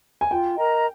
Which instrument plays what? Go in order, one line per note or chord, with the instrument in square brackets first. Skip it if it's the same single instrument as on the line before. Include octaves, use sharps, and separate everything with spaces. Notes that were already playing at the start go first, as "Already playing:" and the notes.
[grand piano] G#5
[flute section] F4 [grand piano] G5
[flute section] A#4 D#5 A#5